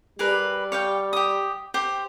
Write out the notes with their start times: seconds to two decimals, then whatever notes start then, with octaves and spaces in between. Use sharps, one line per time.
0.19 G3 G#4 A#4 B4
0.72 C#5 F5 G5
1.13 G4 D#6
1.74 G4 C5